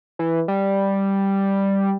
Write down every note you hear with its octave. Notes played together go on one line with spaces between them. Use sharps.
E3
G3